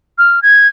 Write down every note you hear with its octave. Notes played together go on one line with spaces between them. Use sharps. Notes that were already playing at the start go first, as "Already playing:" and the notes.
F6
G#6